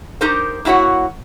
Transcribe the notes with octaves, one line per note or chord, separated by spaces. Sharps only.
D#4 G4 A#4 C5
A#3 E4 F#4 C#5 F#5